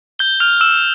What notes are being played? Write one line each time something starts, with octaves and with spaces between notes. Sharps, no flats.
G6 G7
F6 F7
E6 E7